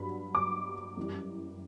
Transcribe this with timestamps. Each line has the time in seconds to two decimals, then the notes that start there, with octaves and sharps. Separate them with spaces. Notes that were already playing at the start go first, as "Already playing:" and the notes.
Already playing: G2 F#3 B5
0.35 D6
0.97 F#2 E3 G3